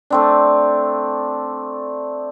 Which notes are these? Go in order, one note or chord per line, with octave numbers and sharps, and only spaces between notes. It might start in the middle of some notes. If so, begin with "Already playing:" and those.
A3 C4 D4